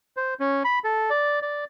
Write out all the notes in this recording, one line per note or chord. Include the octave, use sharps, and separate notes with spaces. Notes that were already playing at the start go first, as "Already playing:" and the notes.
C5
C#4
B5
A4
D5
D5